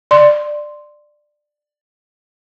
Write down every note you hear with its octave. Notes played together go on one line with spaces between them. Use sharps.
D5 C6